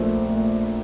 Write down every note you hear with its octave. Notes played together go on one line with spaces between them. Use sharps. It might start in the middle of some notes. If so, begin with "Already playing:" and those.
Already playing: A#1 A#2 A3 C5
A#2 A3